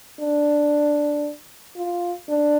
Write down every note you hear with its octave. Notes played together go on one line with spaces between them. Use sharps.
D4
F4
D4